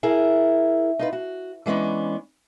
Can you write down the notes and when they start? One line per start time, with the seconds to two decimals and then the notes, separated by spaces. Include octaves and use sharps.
0.03 E4 G#4 A#4
0.99 D#4 F4 B4
1.13 F#4
1.66 E3 G#3 B3 C#4 D4